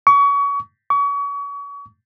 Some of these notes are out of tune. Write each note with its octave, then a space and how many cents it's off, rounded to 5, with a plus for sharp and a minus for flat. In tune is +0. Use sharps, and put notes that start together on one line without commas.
C#6 +30
C#6 +35